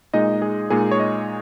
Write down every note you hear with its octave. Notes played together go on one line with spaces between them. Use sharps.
A#2 G#3 D#4 D#5
G#4
A#2 G#3 D#4 G#4
C#5
D#5